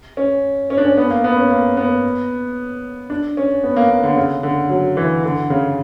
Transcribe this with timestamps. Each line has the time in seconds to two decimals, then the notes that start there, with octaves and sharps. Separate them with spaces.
0.17 C#4
0.70 C#4
0.78 D4
0.85 C#4
0.97 B3
1.10 A#3
1.24 B3
1.37 C#4
1.50 A#3
1.77 B3
3.10 D4
3.37 C#4
3.64 B3
3.76 A#3
3.90 A#3
4.03 D3
4.17 C#3
4.43 D3
4.69 F#3
4.97 E3
5.24 D3
5.50 C#3